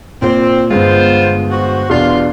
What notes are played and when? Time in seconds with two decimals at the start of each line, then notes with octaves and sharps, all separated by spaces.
0.22 A#2 C4 C5
0.70 G1 G#3 B3 F4 C5
1.51 F#4 C5
1.90 E2 B2 D4 F4 F5 C6